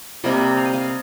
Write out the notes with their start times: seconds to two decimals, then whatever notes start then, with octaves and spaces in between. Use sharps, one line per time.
0.24 C3 G3 A#3 D#5
0.57 F5
0.65 D#5
0.74 F5